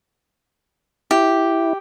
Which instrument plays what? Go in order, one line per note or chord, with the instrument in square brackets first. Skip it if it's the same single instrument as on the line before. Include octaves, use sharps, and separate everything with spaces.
[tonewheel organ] E4 [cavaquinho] G4